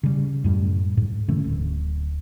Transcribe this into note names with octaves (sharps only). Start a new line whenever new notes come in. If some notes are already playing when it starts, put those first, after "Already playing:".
C#3 G3
F#2 A2 G3
G#2
D3 E3 A3 C#4
D1